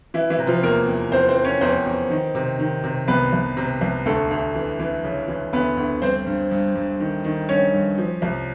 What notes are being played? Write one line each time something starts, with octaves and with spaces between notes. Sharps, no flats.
E3 E4
E3 E4
C3
F3 F4
E2 A#3 A#4
E2
E2 C4 C5
C4 C5
E3
C#4 C#5
E2 C4 C5
E2
D#3
C3
D#3
C3
C2 B3 B4
C2
C3
C2
D2 A3 A4
D2
E3
E3
C#3
E3
D2 B3 B4
D2
G2 C4 C5
G2
G2
G2
D#3
D#3
G2 C#4 C#5
G2
F3
C2